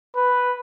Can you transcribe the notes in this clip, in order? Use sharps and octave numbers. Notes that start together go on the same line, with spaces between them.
B4